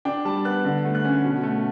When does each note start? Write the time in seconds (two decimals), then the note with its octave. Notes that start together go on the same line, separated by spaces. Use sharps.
0.05 D4 G5
0.25 G3 A5
0.45 B3 F#6
0.64 D3
0.85 A3
0.95 F#6
1.05 C#4
1.24 B2
1.43 A3